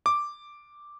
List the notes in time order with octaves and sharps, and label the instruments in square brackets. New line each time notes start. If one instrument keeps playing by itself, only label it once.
[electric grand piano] D6